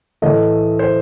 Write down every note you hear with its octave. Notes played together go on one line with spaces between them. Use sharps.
A2 E3 A3 D#5
C5